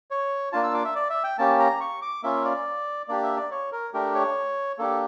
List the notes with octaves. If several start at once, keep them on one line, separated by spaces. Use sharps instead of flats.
C#5
A#3 D4 F4 A5
E6
D6
E5
D5
E5
G5
A#3 C#4 G4 A5
A#5
C#6
D6
A#3 C#4 F4 E5
D5
A#3 D4 G4 D5
E5
D5
C#5
A#4
A3 D4 G4 A#4
C#5
A#3 D4 G4 A4